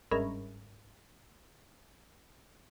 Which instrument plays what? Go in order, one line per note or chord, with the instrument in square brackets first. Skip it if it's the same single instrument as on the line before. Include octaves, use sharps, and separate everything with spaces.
[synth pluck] G1 G#2 C#4 A#4 E5 B5